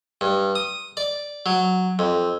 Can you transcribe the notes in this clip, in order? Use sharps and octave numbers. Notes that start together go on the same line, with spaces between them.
G2
D#6
D5
F#3
F2